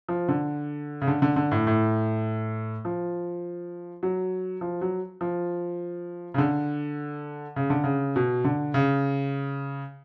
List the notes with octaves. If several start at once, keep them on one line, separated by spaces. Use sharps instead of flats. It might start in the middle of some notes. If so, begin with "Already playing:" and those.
F3
D3
C#3
D3
D3
D3
A2
A2
F3
F#3
F3
F#3
F3
C#3
D3
C#3
D3
C#3
B2
D3
C#3